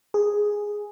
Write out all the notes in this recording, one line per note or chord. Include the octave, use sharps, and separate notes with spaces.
G#4